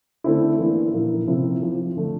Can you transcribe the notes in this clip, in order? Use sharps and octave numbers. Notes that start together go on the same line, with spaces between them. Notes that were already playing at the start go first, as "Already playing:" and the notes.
D3 A3 C4 E4
E3 A#3 D4
A#2 F3 A#3 E4
C3 F3 C4 E4
F3 C4 F4
D3 F3 A3